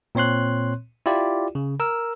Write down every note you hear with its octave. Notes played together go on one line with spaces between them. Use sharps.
A#2 C4 C#5 C6 F#6
E4 F4 G4 D5
C#3
A#4 E6